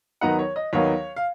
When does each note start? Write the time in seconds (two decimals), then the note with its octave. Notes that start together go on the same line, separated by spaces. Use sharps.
0.21 D#2 D#3 F#3 B3 D#4 F#5 A#5
0.39 C#5
0.56 D#5
0.73 D#2 D#3 F#3 B3 D#4 C#5 F5
1.16 F5